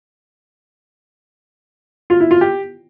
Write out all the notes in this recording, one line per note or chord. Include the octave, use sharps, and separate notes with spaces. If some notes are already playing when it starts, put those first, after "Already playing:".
F4
E4
F4
G4